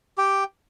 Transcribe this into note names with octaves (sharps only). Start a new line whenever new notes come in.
G4 G5